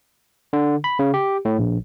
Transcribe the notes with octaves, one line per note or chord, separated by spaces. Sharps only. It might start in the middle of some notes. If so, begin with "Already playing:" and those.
D3
B5
C#3
G4
A2
A#1